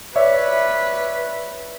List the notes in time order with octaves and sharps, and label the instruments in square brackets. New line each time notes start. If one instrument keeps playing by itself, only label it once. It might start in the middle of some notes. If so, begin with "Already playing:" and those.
[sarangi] B4 [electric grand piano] C#5 D5 E5